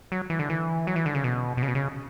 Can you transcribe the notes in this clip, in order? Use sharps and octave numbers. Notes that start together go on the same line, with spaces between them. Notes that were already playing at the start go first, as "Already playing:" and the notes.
F#3
E3
D3
E3
F#3
E3
D3
C#3
B2
B2
C#3
B2
C#3